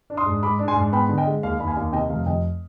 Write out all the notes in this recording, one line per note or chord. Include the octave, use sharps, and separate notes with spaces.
D4
C6 D#6
G#2
G#3 B5 D6
D4
G#5 C6
G#2
B3 G5 B5
D3
D#5 G5
G#3
D#2 F5
D#2 B5
F5 G#5
D#2
C3 D#5 G5
F1 F5
F1 D#5 G5